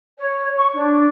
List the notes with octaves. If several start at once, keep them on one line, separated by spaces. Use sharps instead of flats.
C#5
C#6
D4